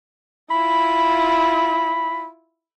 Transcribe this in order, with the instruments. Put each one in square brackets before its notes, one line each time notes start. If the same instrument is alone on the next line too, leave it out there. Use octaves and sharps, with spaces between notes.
[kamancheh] E4 F4 [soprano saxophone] B5